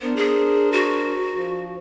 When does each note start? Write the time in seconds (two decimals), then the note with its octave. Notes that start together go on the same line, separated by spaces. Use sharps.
0.01 B3 D4 A#4 C5
0.17 G#4
0.72 F#4
1.34 F3